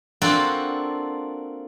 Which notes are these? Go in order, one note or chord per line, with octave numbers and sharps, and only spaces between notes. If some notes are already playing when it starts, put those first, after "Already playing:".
A#3 C4 D4 F4 F#4 A4